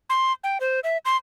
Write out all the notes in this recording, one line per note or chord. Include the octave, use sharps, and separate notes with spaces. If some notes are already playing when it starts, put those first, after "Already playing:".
C6
G5
C5
E5
C6